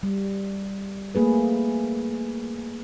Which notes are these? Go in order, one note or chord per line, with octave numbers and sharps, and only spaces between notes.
G3
A3 A#3 G#4 B4